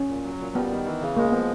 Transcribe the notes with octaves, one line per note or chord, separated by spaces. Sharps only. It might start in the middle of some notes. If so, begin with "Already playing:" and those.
Already playing: C#4
A#2
F#3
A#2
G3 B3
D#3
E3
C#3
G#3 A#3
F3 B3